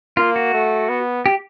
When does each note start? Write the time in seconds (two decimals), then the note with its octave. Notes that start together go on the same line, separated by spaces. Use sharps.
0.17 A#3 F4
0.36 F#4
0.54 A3
0.89 B3
1.26 G4